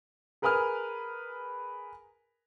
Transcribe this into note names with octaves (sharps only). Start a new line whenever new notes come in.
G#4 A#4 B4 G#5 D#6 F6